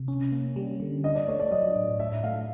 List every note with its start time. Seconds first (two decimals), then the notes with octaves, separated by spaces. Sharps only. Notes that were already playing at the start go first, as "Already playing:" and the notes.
Already playing: C3
0.08 C#4
0.32 A#3
0.56 G3
0.80 D3
1.04 D4 D#5
1.15 D5
1.28 A3 C#5
1.40 D5
1.51 F#3 D#5
1.76 A2
1.99 A2 E5
2.24 A3 F5